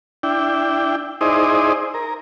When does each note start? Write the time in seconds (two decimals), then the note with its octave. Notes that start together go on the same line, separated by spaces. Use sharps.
0.23 D4 E4 G5
1.21 D#4 E4 G#4 C5 D5 D#5
1.94 A#4